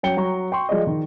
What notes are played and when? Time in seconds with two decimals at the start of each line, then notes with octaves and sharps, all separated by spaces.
0.03 F#3 C#4 G5 C#7 G7
0.17 F#3 A#5 C#6
0.52 G5 C6 C#6
0.69 F3 G#3 D5 D#5
0.87 D#3